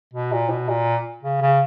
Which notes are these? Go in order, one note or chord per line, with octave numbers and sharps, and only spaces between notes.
B2
A#2
B2
A#2
C#3
C#3